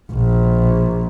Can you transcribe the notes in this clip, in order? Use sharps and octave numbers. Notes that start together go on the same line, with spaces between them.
A#1